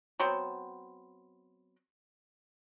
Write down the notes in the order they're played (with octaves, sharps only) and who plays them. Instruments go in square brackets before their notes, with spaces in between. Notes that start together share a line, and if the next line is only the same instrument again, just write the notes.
[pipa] F#3 B3 C4